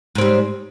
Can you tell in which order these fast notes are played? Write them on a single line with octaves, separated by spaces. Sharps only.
G#2 C4 G3